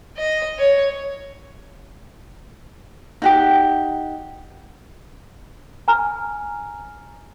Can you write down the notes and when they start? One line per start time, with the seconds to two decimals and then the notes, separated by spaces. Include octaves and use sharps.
0.17 D#5
0.58 C#5
3.22 D#4 F#4 G4
5.88 G#5 A#5 F6